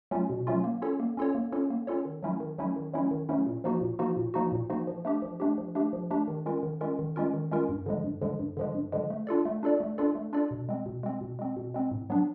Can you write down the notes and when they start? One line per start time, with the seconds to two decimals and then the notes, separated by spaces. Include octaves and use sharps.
0.11 F#3 A3 C#4 F4
0.30 B2
0.47 F#3 A3 C#4 F4
0.64 A#3
0.82 C#4 F4 A4 C#5
1.00 A#3
1.17 C#4 F4 A4 C#5
1.35 A#3
1.52 C#4 F4 A4 C#5
1.70 A#3
1.87 C#4 F4 A4 C#5
2.05 D#3
2.23 F#3 A3 C#4 E4
2.40 D#3
2.58 F#3 A3 C#4 E4
2.76 D#3
2.94 F#3 A3 C#4 E4
3.11 D#3
3.29 F#3 A3 C#4 E4
3.47 A#2
3.64 F3 A#3 D#4 F#4
3.81 A#2
3.99 F3 A#3 D#4 F#4
4.17 A#2
4.34 F3 A#3 D#4 F#4
4.52 A#2
4.70 F3 A#3 D#4 F#4
4.87 F3
5.05 A3 D4 G4
5.22 F3
5.40 A3 D4 G4
5.58 F3
5.75 A3 D4 G4
5.93 F3
6.11 A3 D4 G4
6.28 D#3
6.46 G#3 C#4 F4 A#4
6.63 D#3
6.81 G#3 C#4 F4 A#4
6.99 D#3
7.16 G#3 C#4 F4 A#4
7.34 D#3
7.51 G#3 C#4 F4 A#4
7.69 G2
7.86 D3 F3 G#3
8.04 G2
8.22 D3 F3 G#3
8.39 G2
8.57 D3 F3 G#3
8.75 G2
8.92 D3 F3 G#3
9.10 A3
9.27 D4 F4 A4 D5
9.45 A3
9.63 D4 F4 A4 D5
9.80 A3
9.98 D4 F4 A4 D5
10.15 A3
10.33 D4 F4 A4 D5
10.51 B2
10.69 G#3 C4
10.86 B2
11.03 G#3 C4
11.21 B2
11.39 G#3 C4
11.57 B2
11.74 G#3 C4
11.91 A2
12.10 F#3 B3 D4